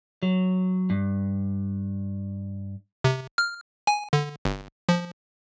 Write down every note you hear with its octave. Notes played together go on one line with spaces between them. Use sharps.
F#3
G2
C3
F6
G#5
D3
G1
F3